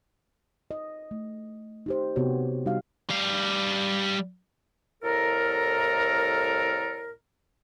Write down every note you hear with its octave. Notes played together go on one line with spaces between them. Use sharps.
D#5
A3
D#4 G4 C5
C3 B3 F#4 G4 C#5
G3 D#4 F#4 G4 F5
G3 F5
C2 A2 A4 A#4